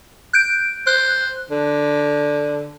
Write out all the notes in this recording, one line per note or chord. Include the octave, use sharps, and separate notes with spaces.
F#6 G6 D7
C5 F#6
D3